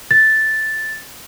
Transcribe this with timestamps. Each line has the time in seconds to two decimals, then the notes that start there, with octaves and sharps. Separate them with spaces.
0.11 A6